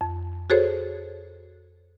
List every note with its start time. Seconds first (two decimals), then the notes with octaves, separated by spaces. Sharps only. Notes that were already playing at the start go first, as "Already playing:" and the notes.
0.01 F2
0.50 F#4 G#4 A4 C5 C#5